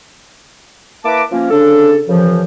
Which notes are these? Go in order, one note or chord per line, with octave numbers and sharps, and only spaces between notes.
A#3 E4 A#4 B4 A5 D6
F3 A#3 C#4
C#3 D4 A4
F#2 C#3 E3 F3